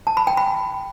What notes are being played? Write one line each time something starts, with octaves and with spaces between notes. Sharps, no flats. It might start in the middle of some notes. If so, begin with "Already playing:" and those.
A5
B5
G5
B5